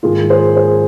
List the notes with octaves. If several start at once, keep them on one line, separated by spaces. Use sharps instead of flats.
G#2 D#3 A#3 F4 G#4
G#4 C5
G#4 C5